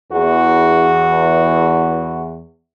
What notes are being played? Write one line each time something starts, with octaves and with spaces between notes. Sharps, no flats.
E2 F#4